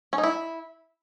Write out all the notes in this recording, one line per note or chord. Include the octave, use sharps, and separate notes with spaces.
C#4
D#4
E4